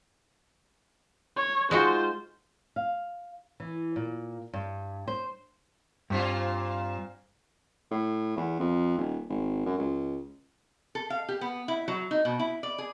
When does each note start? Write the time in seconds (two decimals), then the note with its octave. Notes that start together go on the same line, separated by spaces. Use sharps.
1.37 C#5
1.71 G#3 D#4 F4 F#4 C5
2.76 F5
3.60 E3
3.96 A#2
4.53 G2
5.08 C5
6.10 G2 A#2 C4 F4
7.91 A2
8.37 E2
8.59 F2
8.98 D#1
9.30 G#1
9.66 F#2
9.78 C#2
10.95 A4
11.10 F5
11.29 G4
11.41 B3
11.68 E4
11.88 F#3
12.11 D#4
12.25 B2
12.40 E4
12.63 D5
12.78 G#4